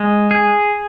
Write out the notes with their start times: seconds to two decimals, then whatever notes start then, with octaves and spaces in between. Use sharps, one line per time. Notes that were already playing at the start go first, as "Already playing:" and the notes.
Already playing: G#3
0.31 G#4